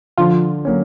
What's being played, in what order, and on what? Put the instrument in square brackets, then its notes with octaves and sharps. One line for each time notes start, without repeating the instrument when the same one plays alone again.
[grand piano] D3 [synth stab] F3 F4
[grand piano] F#3 A#3 C#4